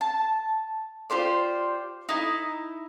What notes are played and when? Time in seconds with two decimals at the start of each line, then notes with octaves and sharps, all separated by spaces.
0.01 A5
1.10 F4 G4 C5 D5
2.09 D#4 E4